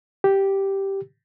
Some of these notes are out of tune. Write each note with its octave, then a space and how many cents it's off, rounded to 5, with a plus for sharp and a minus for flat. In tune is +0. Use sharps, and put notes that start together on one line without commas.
G4 -5